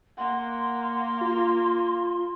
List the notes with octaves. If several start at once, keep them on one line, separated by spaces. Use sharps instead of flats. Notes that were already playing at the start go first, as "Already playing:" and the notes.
A#3 F#5 C6
F4